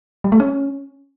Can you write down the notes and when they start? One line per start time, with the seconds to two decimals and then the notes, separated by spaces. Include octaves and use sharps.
0.24 G3
0.32 A3
0.40 C#4